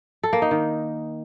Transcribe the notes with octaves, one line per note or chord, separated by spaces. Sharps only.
A4
A#3
D#4
D#3